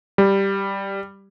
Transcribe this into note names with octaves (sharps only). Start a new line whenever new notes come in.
G3